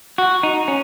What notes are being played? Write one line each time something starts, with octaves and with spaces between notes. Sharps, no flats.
F#4
D#4
C#4